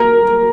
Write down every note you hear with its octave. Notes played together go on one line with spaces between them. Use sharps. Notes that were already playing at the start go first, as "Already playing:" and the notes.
Already playing: A#4